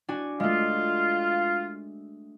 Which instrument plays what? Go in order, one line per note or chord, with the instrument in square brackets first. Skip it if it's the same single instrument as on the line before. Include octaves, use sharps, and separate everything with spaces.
[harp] D4 F#4 G#5
[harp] G#3 A3 [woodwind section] F4